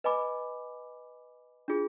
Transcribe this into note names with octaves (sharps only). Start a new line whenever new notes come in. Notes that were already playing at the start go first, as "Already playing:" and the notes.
B4 D#5 G#5 B5 D6
D4 F4 G#4